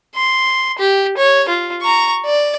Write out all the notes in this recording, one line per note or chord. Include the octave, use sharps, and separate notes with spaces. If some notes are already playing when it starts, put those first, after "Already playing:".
C6
G4
C#5
F4
A#5 C#6
D5